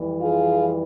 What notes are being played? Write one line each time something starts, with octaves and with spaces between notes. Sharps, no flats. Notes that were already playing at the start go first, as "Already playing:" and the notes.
Already playing: F2 E3 G3
F4 G#4